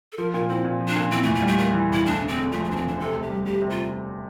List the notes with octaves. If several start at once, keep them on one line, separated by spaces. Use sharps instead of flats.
A4
F3 A#4
A#2 A#4
C4 E4
A#2
F3
D4
A#2
E3 C4
A3
E2
A3
G3
A3
A3 A#3
E3
E2 E4
D2 D4
E1
C4
D3
F3 A3
A3
D2 D4
C4
E1 D4
C3 A4
D2
G4
G3
D2 G4
C3
F4